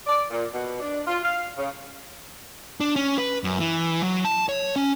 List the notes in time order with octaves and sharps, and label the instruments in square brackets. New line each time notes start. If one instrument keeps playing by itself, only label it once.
[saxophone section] D5
A#2
B2
D4
F4
F5
C#3
[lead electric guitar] D4
C#4
B4
F#2
E3
F#3
A5
C#5
C#4